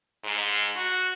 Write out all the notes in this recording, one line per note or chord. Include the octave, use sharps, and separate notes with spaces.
G#2
F#4